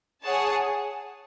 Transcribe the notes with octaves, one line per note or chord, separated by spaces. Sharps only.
G#4 C#5 F#5 A5